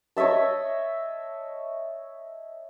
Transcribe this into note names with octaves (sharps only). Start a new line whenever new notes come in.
C#5 D#5 E5 A5